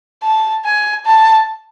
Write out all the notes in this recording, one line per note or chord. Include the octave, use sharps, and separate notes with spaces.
A5
G#5
A5